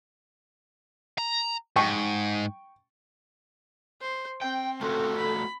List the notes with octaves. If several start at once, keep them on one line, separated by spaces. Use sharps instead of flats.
A#5
G#2 G5 C#6
C5
C4 G5
A3 F4 F#4 A4
B5